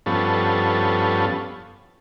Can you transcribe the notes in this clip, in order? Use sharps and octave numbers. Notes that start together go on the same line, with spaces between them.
G2 F3 B3 C#4 A4